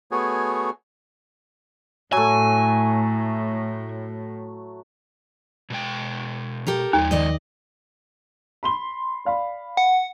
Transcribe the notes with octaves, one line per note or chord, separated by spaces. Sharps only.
A3 B3 F#4 G#4 C#5 G#5
A2 F#3 A3 G#5
B2 G#3 G5
G4 A4 A#4
D#2 F3 G#3 D#4
D#3 D5 D#5
B5 C6 G7
D5 F5 B5
F#5